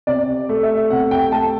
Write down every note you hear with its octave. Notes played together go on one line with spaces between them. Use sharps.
C3 D5
A3
E5
C3 F#5
G5
A3 A5